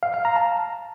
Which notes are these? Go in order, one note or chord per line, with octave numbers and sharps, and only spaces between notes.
F5
F5
A#5
A5